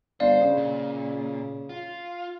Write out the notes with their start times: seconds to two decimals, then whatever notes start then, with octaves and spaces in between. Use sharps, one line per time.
0.20 G1 C5 D5 F5
0.41 C#3
0.57 A#2
1.69 F4